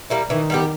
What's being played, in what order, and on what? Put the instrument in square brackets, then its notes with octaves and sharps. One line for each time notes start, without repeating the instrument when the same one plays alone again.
[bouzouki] G3 A#3 E4
[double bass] D#3 [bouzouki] E3
[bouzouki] G3 B3 G4